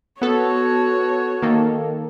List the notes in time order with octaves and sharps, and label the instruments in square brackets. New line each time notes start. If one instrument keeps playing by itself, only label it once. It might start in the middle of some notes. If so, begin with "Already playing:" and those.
[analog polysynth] B3 A4 [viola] F#4 C#5
[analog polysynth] D#3 A#3 A4